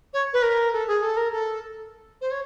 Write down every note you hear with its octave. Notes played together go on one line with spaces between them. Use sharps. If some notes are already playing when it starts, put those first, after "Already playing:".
C#5
B4
A#4
A4
G#4
A4
A#4
A4
C5
C#5